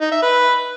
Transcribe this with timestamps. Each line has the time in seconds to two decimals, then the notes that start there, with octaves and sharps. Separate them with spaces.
0.01 D#4
0.12 E5
0.22 B4